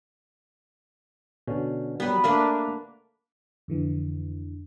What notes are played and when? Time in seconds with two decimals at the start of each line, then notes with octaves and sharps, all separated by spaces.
1.47 B2 D3 C#4
2.00 F#3 G3 B3 B4
2.24 A3 A#3 D4 B4 F5
3.68 F2 D3 E3